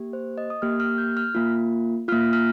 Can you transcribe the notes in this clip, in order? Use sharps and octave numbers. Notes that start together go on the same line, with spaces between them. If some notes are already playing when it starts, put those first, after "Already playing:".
Already playing: A#3 G4
C5
D#5
D#6
A#3 G4 F6
F6
G6
F6
A#3 F4
A#3 F4 F6
F6